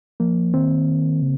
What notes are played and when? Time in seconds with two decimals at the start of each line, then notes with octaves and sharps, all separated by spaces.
0.20 F3 A#3
0.54 D#3 C4
1.22 C#3